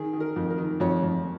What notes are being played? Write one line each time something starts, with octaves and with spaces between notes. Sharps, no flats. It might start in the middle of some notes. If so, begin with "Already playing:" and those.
Already playing: D#3 G#4
D#3
A#4
F2
A#4
D#3
F2 C#5
F2